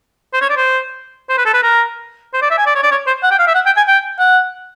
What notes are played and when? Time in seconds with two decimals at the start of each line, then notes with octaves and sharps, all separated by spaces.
0.34 C5
0.41 C#5
0.50 D5
0.57 C5
1.30 C5
1.38 B4
1.46 A4
1.54 B4
1.63 A#4
2.34 C5
2.42 D5
2.51 E5
2.58 G#5
2.66 D5
2.75 C#5
2.83 D5
2.91 C#5
3.07 C5
3.23 F#5
3.31 G5
3.39 F5
3.47 E5
3.55 F#5
3.66 G5
3.77 G#5
3.88 G5
4.19 F#5